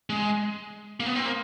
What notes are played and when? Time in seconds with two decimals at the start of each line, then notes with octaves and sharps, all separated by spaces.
0.10 G#3
1.00 A#3
1.06 B3
1.15 C4
1.25 A#3